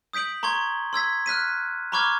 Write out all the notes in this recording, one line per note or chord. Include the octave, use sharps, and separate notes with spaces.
D#6 G6 B6 D7 F#7
A#5 C6 C#6 G#6 G7
C6 E6 G#6 B6
F6 F#6 B6 D#7
A#5 B5 C#6 D6 F6 G#6